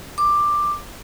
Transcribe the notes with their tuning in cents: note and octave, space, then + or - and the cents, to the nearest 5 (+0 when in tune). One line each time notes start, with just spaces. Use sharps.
D6 +10